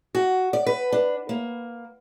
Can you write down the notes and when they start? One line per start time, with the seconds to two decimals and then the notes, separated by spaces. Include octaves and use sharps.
0.15 F#4
0.53 D5
0.66 B4
0.92 D4
1.29 A#3